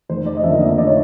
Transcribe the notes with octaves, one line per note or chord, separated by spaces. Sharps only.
F1 C5
D5
D#5
F2 D3 F3 A#3 E5
D#5
F1 D5
C#5